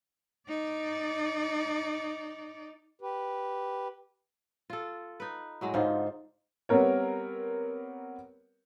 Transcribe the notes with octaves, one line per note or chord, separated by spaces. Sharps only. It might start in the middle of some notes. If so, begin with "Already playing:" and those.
D#4 D5
G4 B4
F4 A4
D#4 B4
A2 F#3 G#3
G#2 D3 D#4 F4 C5 F5
G3 B3 C4 A#4 C#5